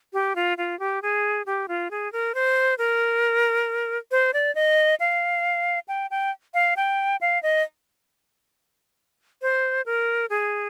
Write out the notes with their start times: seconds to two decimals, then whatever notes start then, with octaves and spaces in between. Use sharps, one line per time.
0.13 G4
0.36 F4
0.58 F4
0.79 G4
1.02 G#4
1.46 G4
1.68 F4
1.91 G#4
2.12 A#4
2.35 C5
2.78 A#4
4.11 C5
4.34 D5
4.55 D#5
5.00 F5
5.88 G5
6.11 G5
6.54 F5
6.77 G5
7.21 F5
7.43 D#5
9.42 C5
9.86 A#4
10.30 G#4